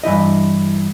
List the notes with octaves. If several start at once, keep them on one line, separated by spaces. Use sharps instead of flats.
G2 E3 E4 D#5